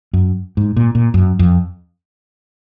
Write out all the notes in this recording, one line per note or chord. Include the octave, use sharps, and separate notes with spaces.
F#2
G#2
A#2
A#2
F#2
F2